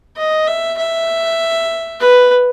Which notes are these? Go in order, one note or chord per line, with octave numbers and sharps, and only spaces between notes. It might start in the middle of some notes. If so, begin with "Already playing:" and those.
D#5
E5
E5
B4